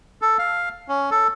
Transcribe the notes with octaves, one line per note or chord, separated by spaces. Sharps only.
A4
F5
C#4
A4